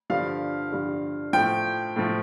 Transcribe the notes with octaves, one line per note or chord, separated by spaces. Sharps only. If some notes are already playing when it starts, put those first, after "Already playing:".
G2 D3 F3 F5
G2 D3 F3
A2 F3 G5
A2 F3